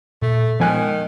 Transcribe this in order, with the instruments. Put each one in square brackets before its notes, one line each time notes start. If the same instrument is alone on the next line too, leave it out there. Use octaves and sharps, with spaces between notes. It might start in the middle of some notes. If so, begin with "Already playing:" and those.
[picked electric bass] A#2 [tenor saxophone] A3
[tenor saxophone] D#3 [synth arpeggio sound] F3 G#5 F#6 [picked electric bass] G#3 A#3 B3